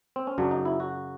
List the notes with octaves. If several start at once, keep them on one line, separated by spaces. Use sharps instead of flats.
C4
C#4
F#2 C#3 F#3 D4
D#4
E4
F#4